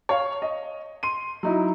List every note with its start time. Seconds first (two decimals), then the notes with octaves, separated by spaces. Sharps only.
0.09 C#5 F5
0.42 D#5
1.03 C6 D#7
1.43 F#3 D#4 E4